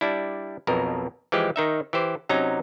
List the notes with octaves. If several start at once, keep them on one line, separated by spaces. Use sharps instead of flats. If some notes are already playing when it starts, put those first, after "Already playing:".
G3 D4 E4
B1 F2 B2 A#4
E3 F3 G#3 G4
D#3 D#4 E5
E3 G4 C5
C3 F#3 C#4 D#4 A#5